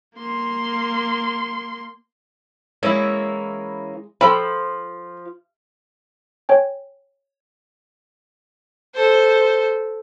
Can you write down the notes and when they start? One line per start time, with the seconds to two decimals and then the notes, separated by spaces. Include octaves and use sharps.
0.16 A#3 C6
2.83 E3 G#3 A#3 C#4 E4
4.21 F3 A4 G5 B5
6.49 C#5 G5 G#5
8.94 A4 C5